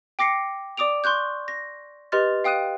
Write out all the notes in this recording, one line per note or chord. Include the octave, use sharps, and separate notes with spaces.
G5 D6 A#6 C7 C#7
D5 D6 D#6 D7 F7
C6 C#6 F#6 G6
A#6
G4 B4 D#5 C6 F6 A6
F5 G5 D#6 F#6 D#7